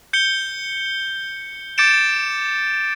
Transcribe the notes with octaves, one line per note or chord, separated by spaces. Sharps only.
G6 C#7 G7
D6 G6 A6 C#7 D7 E7